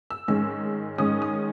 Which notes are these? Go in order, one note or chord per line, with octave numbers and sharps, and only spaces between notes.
E6
G#2 D#3 G#3 C#4 E6
G#2 D#3 G#3 C#4 D#6
D#6